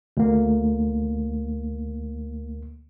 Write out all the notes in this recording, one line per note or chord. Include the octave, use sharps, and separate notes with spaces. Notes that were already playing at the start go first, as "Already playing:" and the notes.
D2 A#3